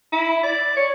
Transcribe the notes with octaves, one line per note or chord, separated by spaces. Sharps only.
E4
D5
C#5